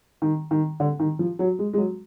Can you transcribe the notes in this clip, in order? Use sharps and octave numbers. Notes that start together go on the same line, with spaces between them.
D#3
D#3
D3
D#3
F3
F#3
G#3
G#3
F#3